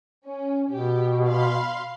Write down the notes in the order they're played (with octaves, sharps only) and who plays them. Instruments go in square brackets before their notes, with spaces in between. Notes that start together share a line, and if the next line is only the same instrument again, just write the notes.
[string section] C#4
[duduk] B2 [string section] G4
[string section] F5 B5 C6